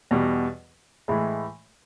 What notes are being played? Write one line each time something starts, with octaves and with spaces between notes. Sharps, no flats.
E2 B2 G3
A2 E3 G#3